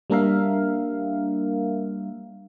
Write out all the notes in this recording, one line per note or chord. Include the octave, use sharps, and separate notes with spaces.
G3 A#3 D4 A#4 E5 F5